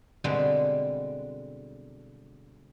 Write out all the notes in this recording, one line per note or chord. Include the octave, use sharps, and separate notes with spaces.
B2 D3 G3 G#3 C4